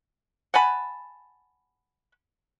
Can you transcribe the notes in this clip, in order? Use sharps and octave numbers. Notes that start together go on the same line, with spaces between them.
F#5 G#5 A5 B5